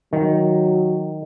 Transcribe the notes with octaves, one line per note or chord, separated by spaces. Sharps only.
D#3 F#3